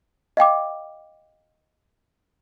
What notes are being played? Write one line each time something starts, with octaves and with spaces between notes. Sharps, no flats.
D#5 F5 G5 D6